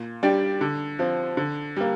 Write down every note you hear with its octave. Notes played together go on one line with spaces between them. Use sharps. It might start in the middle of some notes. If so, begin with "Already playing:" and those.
Already playing: A#2
G3 D4 G4 D5
D3
F3 C4
D3
G3 A#3